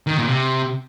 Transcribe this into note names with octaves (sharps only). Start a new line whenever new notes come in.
D#3
A#2
C3